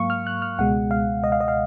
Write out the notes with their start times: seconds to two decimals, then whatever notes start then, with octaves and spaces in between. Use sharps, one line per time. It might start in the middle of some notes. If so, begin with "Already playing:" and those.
Already playing: G#2 F#3 A#3 F5 C#6
0.10 F6
0.27 F#6
0.42 F6
0.58 C#2 B2 G#3 F#5
0.91 F5
1.24 D#5
1.32 F5
1.40 D#5
1.48 F5